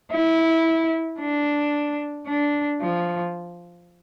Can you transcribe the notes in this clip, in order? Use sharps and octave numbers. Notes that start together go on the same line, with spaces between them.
E4
D4
D4
F3